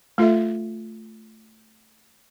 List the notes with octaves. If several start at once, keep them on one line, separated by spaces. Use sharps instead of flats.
A3 F4 A4 E5